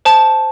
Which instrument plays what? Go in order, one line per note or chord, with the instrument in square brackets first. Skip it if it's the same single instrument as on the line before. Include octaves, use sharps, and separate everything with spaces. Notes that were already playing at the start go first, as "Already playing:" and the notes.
[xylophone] C5 A5